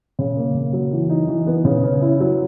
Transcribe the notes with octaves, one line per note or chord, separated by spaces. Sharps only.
C#3
A#3
C#3
F#3
E3
D#4
E3
B3
C#3
C#4
E4
F#3